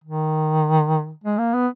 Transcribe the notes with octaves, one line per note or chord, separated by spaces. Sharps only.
D#3
G#3
A#3
B3